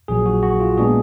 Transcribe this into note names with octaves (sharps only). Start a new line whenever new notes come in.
A#1 A#2 F#3 G#4
F#4
F#4
F4
A#2 G#3 B3 D4 G#4